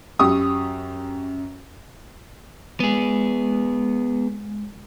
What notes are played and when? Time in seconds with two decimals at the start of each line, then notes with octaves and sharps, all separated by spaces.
0.19 F#2 G4 C#6 D#6
2.80 G#3 B3 G#4